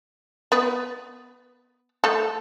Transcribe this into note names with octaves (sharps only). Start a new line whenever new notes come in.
B3 B4
A3 A4